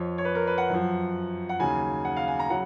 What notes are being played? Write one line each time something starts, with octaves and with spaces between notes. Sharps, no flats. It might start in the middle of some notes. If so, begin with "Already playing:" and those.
Already playing: F2 F3 C#5
C#5
B4
A#4
B4
F#5
F#2 F3
F#5
D#2 C#3 F#3 G#5
F#5
F5
G#5
A#5
C#3 F#3 F#5